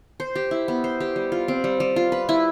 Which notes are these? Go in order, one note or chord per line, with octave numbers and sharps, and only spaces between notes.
C5
G4
E4
B3
C5
G4
G3
F4
C4
G3
G3
F4
B4
E4